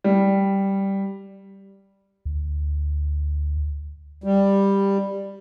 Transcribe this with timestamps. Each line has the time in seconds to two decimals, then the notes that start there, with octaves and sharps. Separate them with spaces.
0.04 G3
2.25 D2
4.24 G3